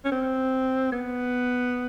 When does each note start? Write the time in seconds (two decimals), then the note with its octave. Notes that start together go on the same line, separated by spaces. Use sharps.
0.05 C#4
0.12 C4
0.92 B3